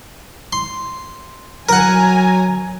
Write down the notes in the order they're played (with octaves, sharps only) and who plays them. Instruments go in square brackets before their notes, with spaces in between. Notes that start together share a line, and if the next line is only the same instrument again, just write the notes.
[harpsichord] C6
[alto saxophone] F#3 [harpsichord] A#4 F#5 [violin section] G#5 A#5